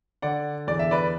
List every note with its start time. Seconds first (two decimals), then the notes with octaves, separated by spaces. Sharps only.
0.22 D3 D5 F#5
0.67 E2 D5
0.79 E5
0.91 B4 D5